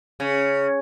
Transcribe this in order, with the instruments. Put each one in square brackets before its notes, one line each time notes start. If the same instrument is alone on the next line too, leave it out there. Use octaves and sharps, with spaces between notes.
[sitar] C#3